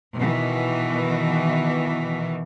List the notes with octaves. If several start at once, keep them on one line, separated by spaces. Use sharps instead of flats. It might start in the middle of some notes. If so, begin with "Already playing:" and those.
B2 D#3 E3